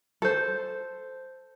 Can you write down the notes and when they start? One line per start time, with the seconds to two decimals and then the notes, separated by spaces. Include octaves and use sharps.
0.22 A4 C5